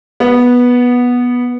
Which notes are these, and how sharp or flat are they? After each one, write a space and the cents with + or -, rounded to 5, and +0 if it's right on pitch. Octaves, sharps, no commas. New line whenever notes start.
B3 -10